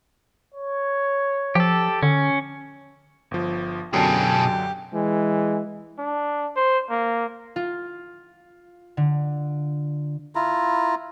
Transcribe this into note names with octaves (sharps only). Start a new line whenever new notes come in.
C#5
F3 G4 A4
D3 C#4
G1 F3
F#2 B2 D3 F#3 G4 G#4 A5
E3 G#3
D4
C5
A#3
F4
D3
E4 F4 A#5